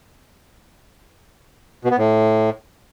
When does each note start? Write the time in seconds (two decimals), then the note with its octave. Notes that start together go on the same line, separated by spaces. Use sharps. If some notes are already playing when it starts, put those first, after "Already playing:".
1.85 B2
1.91 B3
1.98 A2